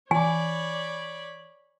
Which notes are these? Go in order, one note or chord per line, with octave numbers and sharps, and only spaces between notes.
E3 C#5 D5 G#5 B5